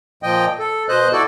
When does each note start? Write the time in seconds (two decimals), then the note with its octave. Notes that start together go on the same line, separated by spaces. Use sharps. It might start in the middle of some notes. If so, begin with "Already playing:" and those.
0.23 A#2 F3 D#5 G5
0.59 A4
0.89 B2 C5 D#5 F#6
1.12 E4 F#4 A4 D5